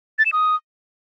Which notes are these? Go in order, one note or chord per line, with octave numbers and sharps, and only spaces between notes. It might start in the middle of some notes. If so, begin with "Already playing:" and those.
A6
E7
D#6